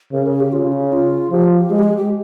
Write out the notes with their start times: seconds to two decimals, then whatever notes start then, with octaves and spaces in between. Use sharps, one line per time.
0.13 C#3 A#4
0.27 G#4
0.40 G4
0.52 C#3 F4
0.73 C#4
0.92 F4
1.31 F3 G4
1.57 G4
1.70 G#3 G#4
1.79 G4
1.83 G#4
1.97 G4